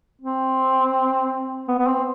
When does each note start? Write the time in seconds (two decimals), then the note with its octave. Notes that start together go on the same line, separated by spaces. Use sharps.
0.21 C4
1.68 B3
1.78 B3
1.87 C4